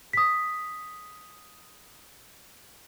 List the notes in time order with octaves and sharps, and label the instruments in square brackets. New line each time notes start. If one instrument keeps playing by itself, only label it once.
[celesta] D#6 B6